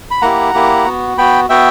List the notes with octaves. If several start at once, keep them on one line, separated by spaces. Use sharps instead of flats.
B5
A#3 E4 G4 F#5 A#5
A#3 E4 G4
B3 F#4
B3 F#4 G5 B5
B3 F#4 E5 G5